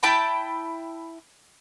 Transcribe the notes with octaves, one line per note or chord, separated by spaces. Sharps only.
E4 G5 A5 B5